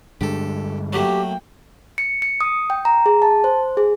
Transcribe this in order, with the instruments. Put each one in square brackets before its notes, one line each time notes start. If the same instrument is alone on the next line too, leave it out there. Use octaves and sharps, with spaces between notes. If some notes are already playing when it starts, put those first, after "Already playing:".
[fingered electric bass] G2 D3 G#3 [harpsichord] G4 A4
[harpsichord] F#3 A3 [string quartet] A#3 G5 [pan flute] G4
[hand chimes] C#7
C#7
D#6
G5
A#5
G#4
A5
C5
G#4